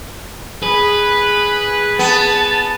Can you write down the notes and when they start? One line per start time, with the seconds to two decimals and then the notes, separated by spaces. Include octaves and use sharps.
0.63 G#4 B4
1.99 B3 A5